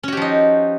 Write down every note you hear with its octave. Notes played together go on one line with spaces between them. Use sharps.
F3 C#4 D#4 F#4 G4